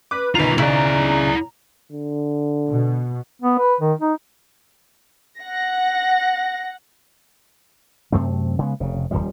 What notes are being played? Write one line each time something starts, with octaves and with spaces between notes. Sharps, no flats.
B4 D6
B1 D#3 F4 B4 A#5 F7
C#3 E4 D5
D3
B2
B3
B4
D#3
D#4
F#5 A#6
F#2 C3 A3 C4
C#3 G#3 B3
F1 C#3
D#1 B1 F3 G3